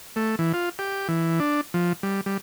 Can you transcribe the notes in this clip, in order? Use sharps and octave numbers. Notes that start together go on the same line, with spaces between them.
A3
E3
F4
G4
E3
D4
F3
G3
G3